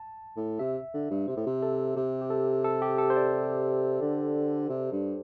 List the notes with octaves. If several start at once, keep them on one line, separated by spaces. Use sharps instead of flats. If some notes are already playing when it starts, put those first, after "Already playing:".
Already playing: A5
A2
C3 E5
D3
G2
C3 C5
A2
C3
A4
C3 G4
G4
A4
A4
G4
A4
C5
D5
D3
C3
G2